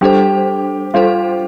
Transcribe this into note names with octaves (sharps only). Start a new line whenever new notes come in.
G3 D4 G4 A4 C5
G3 D4 F4 A4 C5